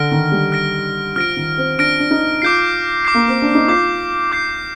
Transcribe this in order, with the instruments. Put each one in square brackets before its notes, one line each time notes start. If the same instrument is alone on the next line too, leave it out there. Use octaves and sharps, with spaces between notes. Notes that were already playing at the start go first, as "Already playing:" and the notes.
Already playing: [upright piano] D3 [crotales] F6 A#6 D7
[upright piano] D#3
G3
[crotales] F6 A#6 D7
[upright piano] F3 [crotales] F6 A#6 D7
[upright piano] D#3
C4
[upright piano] D4 [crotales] F6 A#6 D7
[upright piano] D4
D#4
[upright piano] F4 [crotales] D6 G6 C7
[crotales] D6 G6 C7
[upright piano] A#3
C4
D4
D#4
[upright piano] F4 [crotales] D6 G6 C7
[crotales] D6 G6 C7